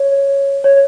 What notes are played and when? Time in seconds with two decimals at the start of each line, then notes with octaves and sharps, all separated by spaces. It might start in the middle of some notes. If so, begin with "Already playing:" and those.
Already playing: C#5
0.64 C#5